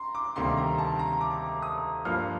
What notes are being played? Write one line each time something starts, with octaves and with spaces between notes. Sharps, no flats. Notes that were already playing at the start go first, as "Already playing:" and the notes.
Already playing: A#5 C6
D6
D2 C3 D#3 G3 A#3 C6
A#5
A5
A#5
D6
D#6
G2 F3 A#3 F6